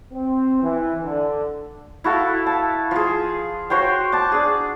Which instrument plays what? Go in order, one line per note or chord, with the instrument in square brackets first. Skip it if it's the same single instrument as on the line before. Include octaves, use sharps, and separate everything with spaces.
[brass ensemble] C4
E3
D3
[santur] E4 F#4 A4 F5
A5
F3 G#4
F#4 C5 C#5 G5
A5 D6
D4 G#4